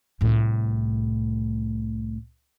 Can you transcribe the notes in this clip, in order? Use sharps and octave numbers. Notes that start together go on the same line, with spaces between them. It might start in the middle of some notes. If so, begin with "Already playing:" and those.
C2 A2